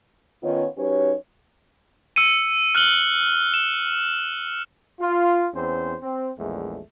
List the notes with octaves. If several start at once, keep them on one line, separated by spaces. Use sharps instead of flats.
D#3 B3 C#4 D#4 F4 C#5
F#3 C#4 D#4 G4 B4 C#5
E6 C#7 D#7
F6 F#6 D#7 F#7 G7
E7
F4
E2 C4 C#4 C5
C4
A#1 E2 G#3 A3